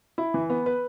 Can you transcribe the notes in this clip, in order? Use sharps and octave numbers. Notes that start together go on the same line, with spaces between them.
E4
E3
B3
B4